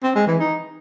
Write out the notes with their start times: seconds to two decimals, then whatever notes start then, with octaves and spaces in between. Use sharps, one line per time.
0.03 C4
0.15 G#3
0.27 E3
0.39 D#4